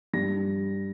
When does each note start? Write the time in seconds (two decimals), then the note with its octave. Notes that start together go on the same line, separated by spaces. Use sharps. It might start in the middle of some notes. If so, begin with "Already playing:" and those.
0.14 G2 A#6